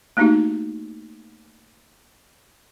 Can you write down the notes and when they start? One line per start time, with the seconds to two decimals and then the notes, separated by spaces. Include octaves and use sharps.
0.17 A3 A#3 D4 D#4 F#4 G4